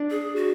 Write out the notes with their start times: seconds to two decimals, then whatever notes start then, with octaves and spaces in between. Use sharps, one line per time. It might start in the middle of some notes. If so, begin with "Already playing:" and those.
Already playing: D4
0.11 G#4
0.36 F#4